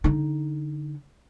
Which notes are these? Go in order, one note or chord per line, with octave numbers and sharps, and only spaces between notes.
D3 D#4